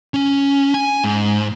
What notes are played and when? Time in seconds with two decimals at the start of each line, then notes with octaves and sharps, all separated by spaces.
0.14 C#4
0.74 G#5
1.04 G#2